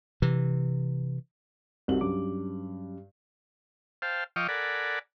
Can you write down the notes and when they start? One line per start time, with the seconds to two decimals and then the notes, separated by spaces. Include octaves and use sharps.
0.22 C3 E3
1.88 C2 C4 D#4 F#4 F#7
2.01 G2 F#3 C#4 D6
4.02 C5 F5 G5 A5
4.36 F3 D#5 F5 G5 C#6 D6
4.48 A4 A#4 D5 F#5 G#5 B5